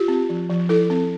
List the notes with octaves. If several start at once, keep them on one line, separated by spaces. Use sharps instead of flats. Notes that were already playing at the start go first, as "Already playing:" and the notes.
Already playing: F4 G4
C4
F3
F3
E4 A4
C4